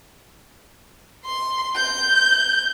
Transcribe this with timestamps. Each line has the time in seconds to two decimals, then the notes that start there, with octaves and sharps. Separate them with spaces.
1.25 C6
1.76 G6